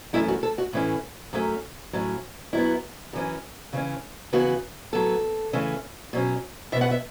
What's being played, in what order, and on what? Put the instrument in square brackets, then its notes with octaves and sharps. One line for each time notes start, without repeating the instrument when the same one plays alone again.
[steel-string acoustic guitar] F#2 E3 A3 C#4 E4
F#4
A4
F#4
A2 E3 A3 C#4
F#2 F#3 A3 C#4
A2 F#3 C#4
F#2 F#3 B3 E4
F#2 E3 C#4
C#3 E3 C#4
C#3 E3 B3 F#4
A2 F#3 B3 A4
C#3 E3 A3 C#4
B2 F#3 C#4
B2 E5
B3 F#5
E5